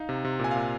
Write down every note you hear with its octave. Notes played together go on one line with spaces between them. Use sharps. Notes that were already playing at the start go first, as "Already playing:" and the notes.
Already playing: D#4 F5
C3
C3
A#2 G#5
A#2 F5